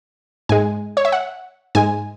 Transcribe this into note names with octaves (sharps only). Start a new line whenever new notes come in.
G#2 G#3 G#5
C#5
E5
F#5
G#2 G#3 G#5